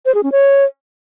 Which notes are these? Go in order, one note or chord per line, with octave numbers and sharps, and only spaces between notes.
C5
G#4
C#4
C#5